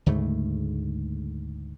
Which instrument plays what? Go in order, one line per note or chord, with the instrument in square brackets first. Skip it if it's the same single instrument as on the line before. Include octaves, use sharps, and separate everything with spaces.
[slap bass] D2 G#2 C#3 A3